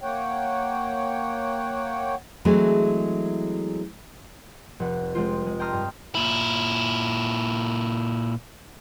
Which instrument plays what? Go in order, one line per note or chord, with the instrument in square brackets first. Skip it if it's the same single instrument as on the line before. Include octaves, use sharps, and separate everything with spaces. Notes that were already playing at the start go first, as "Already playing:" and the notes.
[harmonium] A#3 C#5 F#5 G5
[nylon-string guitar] E3 F#3 G#3 A3 C4
[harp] F1 F#5
F3 G#3 C4 F4
G#3
G5 A5 A#5 C6 D#6 F6
G2
[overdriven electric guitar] A#2 E4